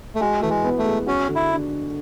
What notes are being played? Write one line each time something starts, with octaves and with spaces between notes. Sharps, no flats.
A3
G#3 F#4
E3 A3
G#3
B3
A3
G#3
C#4 F#4
D3
E4
D4